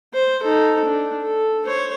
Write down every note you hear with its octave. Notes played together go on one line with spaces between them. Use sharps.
C5
D#4 A4
D4
A4
C5 C#5